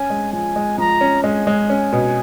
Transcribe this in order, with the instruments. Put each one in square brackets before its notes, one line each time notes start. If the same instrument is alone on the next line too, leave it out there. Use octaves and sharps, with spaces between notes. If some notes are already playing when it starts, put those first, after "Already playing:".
Already playing: [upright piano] C#4 [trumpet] G#5
[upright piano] G#3
[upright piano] F3 [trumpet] G#5
[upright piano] G#3
[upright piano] F3 [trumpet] A#5
[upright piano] C#4
[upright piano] G#3 [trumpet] G#5
[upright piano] G#3
C#4
B2